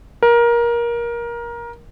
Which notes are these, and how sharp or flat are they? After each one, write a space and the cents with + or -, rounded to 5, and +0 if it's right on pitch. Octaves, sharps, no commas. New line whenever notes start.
A#4 +20